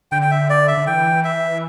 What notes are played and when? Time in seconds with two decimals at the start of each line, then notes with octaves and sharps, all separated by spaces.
0.12 D3 G5
0.22 G5
0.31 E5
0.50 D5
0.68 E5
0.77 D3
0.87 E3 G5
1.24 E5